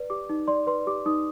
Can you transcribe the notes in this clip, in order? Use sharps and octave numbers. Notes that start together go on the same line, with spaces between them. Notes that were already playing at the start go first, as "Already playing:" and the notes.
Already playing: B4 D5
G4 D6
D#4
D5 C6
B4 C6
G4 D6
D#4 D#6